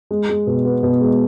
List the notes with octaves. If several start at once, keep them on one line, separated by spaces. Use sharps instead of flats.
G#3
G#3
B2
B3
B2
G#3